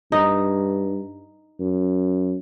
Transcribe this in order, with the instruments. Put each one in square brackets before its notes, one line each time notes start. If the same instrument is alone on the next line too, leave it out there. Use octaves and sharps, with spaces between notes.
[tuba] G2 [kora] D#4
[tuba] F#2